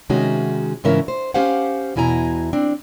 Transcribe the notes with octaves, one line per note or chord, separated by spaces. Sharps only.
C3 D#3 G#3 C#4 D#4 F#4
G#2 C#3 E3 C#4 A#4 E5
C5
C#4 G4 C5 F5 F#5
E2 B2 E4 G#5 A#5
C4 D4